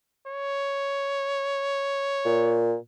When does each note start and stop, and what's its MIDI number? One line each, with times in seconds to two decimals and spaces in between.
0.26 2.66 73
2.25 2.75 46